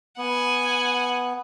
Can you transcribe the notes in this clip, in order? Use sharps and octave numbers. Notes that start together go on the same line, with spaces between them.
B3 F#5 G#5